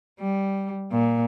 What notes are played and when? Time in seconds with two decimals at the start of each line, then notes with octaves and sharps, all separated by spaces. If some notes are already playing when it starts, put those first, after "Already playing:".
0.20 G3
0.92 A#2